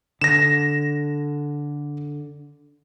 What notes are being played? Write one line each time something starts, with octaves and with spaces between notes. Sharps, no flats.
D3 A#6 E7